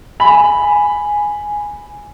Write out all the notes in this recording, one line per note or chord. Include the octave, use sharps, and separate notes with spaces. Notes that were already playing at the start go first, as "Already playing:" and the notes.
G#5 B5